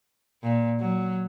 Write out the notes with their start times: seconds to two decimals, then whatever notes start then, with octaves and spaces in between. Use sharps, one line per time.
0.43 A#2
0.80 F#3